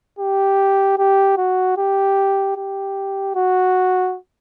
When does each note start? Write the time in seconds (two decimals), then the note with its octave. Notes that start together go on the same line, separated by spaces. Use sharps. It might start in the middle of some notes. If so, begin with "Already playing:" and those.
0.19 G4
0.98 G4
1.37 F#4
1.77 G4
2.56 G4
3.35 F#4